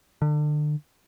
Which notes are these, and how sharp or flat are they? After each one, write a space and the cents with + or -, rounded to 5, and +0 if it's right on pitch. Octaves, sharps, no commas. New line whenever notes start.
D3 +30